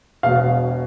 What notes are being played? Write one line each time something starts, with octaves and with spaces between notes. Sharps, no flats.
E1 B2 F5